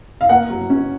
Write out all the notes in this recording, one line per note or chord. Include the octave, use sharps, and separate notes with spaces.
F5
A#3 F#5
F#3
C#4